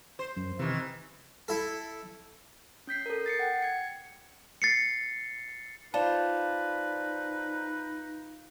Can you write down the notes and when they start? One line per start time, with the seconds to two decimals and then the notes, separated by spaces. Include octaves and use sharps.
0.19 C5
0.36 F#2
0.59 C3 D#3 E3
1.48 E4 A4
2.87 C#4 G6 B6 C7
3.06 A4 A#4
3.26 A6 C7 C#7
3.39 F#5 G5
3.62 G#6 C#7
4.62 A6 C7 C#7
5.94 D#4 F4 B4 C5 D5 A5